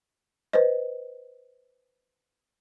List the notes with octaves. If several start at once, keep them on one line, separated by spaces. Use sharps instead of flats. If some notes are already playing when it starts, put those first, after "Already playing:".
B4 C5 D#5